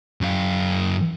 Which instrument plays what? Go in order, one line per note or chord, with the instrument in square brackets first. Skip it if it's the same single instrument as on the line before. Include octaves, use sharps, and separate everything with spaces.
[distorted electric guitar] F#2 F5